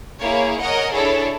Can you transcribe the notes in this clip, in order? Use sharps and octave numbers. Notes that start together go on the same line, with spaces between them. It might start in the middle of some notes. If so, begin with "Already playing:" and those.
A#3 E4 G#4 C#5
A#4 C#5 D#5 F#5 G#5
D4 E4 G#4 A4 C#5